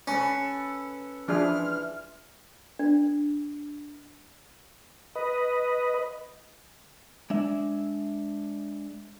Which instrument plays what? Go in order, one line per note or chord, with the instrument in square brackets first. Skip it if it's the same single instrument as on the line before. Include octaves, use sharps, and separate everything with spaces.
[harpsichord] C#4 [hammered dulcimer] A4 B4 B5
[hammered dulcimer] E3 B4 C6 [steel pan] F3 D4 G#4 [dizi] F6
[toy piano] D4
[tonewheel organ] B4 D#5
[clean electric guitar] G#3 D4 E5